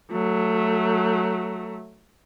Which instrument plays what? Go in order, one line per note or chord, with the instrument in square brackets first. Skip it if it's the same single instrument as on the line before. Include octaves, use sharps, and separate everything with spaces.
[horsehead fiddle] F#3 A3